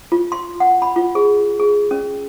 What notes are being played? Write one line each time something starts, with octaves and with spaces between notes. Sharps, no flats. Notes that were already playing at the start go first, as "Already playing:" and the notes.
F4
C6
F#5
B5
F4
G#4
G#4
C#4